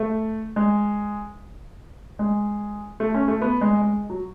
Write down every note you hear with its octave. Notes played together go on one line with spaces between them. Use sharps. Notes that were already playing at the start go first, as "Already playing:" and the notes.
Already playing: A3
G#3
G#3
A3
C#4
A3
B3
G#3
G#3
F#3